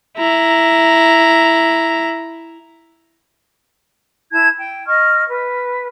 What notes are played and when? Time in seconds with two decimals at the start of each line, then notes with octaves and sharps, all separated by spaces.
0.17 E4 A#5
4.32 E4 A5 G#6
4.58 G5
4.87 D#5 C#6 F6
5.29 B4